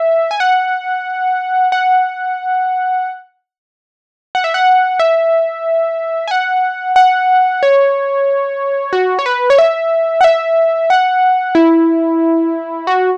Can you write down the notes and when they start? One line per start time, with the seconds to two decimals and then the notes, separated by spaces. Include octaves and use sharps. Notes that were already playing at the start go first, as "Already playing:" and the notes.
Already playing: E5
0.31 G#5
0.40 F#5
1.72 F#5
4.35 F#5
4.44 E5
4.54 F#5
4.99 E5
6.28 G#5
6.31 F#5
6.96 F#5
7.63 C#5
8.93 F#4
9.19 C#5
9.26 B4
9.50 C#5
9.59 E5
10.21 F#5
10.24 E5
10.90 F#5
11.55 E4
12.87 F#4